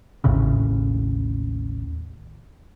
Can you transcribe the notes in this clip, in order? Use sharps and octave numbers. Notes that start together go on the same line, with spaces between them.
A1 D#2 A2 C#3